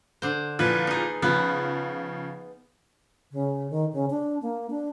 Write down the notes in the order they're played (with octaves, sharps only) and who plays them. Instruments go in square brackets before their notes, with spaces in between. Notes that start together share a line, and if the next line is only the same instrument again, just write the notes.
[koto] D3 C5
[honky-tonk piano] A#2 E3 F3 [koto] B4
[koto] D#4 G#4
[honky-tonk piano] C#3 F3 [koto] B3
[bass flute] C#3
D#3
C#3
D4
A#3
D4